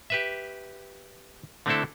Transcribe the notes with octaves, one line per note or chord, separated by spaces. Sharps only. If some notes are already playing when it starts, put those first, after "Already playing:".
G4 B4 E5
D3 A3 C4 D4 E4 A4